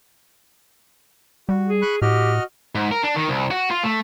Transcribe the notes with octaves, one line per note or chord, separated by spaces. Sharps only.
G3 F#4
G#4
B5 C#6 F#6
A2 F#4 G4 D#5 F6
G#2
A#4
D4
D#3
C2
F#4
F4
A3